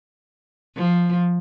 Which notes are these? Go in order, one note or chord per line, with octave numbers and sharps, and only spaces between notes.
F3